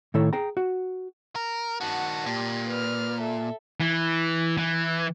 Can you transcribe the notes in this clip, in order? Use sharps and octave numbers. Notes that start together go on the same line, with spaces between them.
A2 D#3 E4 A4 C#5 A#5
G#4 G5 A#5
F#4
A#4
D#3 F#4 F#5 A5
A#2 G4
B4 F6
A4 E5
E3
E3